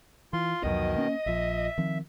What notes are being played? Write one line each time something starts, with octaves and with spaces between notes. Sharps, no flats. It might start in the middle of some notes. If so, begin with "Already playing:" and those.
E3 F4 C6
C2 F2 B2 D#3 F#3 D#5
A#3 C#4
A#1 F3 E5
D#3 F3 C4